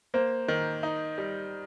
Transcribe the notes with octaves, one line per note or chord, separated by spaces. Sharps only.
A#3 C5
D#3
D#4
G3